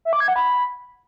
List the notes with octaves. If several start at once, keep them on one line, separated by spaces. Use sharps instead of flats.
E5
D6
G#6
F#5
B5